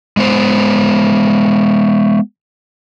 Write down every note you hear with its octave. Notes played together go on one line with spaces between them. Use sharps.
G#3 B3 C5